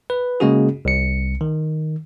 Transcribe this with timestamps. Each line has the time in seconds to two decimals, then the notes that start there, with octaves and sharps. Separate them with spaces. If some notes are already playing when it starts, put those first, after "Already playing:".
0.10 B4
0.40 C#3 G#3 A#3 C#4 F#4 G#4
0.85 C2 C#7
1.41 D#3